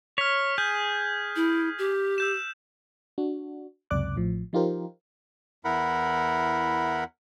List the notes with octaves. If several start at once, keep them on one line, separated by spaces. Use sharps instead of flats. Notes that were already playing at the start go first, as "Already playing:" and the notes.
C#5 F6 B6
G#4 G6
E4
G4
E6 G6 E7
D4 F#4
C#2 F#2 C3 D5 D6 F#6
A1 A2 F3
F3 D#4 F4 G4 A#4 C5
E2 E4 A#4 F#5 B5